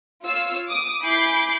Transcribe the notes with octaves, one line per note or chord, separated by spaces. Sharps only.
F4 C#5 F5 E6
D6 D#6
E4 G#5 B5 D6 G6 C7